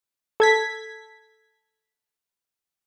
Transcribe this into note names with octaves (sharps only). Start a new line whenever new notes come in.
A4 G#6 B6